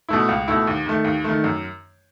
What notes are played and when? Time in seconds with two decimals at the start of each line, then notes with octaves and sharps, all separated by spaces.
0.09 B2 A3 E4
0.29 C#2
0.48 B2 A3 E4
0.67 D#2
0.86 D#3 A3
1.04 D#2
1.24 D#3 A3
1.44 F#2